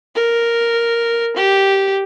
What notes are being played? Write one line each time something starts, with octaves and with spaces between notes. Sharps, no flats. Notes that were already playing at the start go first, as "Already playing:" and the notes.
A#4
G4